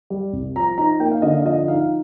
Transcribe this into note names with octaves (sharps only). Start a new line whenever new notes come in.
G3
C2
F3 A#5
D#4 A#5
A#3 G5
F5
D3 D#5
F5
F3 D#5
D#4 F5